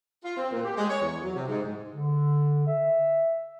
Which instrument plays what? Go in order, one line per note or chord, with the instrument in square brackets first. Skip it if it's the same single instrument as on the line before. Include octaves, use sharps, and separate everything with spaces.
[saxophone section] F4
C4
A#2
G4
G#3
C#5
E2
F#3
C3
G#2
G#2
[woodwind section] D3
E5